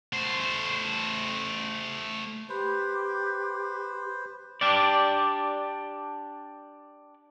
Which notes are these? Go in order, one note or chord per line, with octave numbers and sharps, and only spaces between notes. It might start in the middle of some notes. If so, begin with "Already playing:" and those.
A3 C5
G4 B4 C5
D4 G4 D5